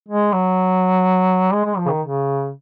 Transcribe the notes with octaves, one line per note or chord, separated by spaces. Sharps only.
G#3
F#3
G#3
G#3
F3
C#3
D#3
C#3